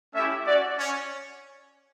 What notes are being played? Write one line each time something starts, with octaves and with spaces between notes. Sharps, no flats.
A3 C#4 E4 G4 E5
C#4 F#4 D5
C#4 C#5